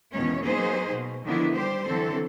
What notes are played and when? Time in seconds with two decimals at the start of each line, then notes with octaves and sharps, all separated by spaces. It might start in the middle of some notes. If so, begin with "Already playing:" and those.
0.14 E2 G#2 B2 D#3 C#4 C#5
0.43 F#3 A#3 B3 D#4 G#4 C5
0.93 B2
1.25 D3 D#3 F3 B3 D4 E4
1.54 G3 G4 C5
1.87 D3 E3 F#3 C4 A4